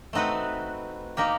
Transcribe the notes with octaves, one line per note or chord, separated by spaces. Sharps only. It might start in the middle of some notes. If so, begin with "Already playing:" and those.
A3 C4 D#4 F#4 B4
A#3 D#4 G4 A#4